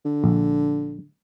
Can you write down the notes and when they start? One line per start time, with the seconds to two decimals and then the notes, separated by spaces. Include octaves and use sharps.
0.06 D3
0.24 A#1